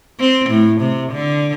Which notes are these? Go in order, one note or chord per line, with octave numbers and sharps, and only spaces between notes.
C4
A2
C3
D3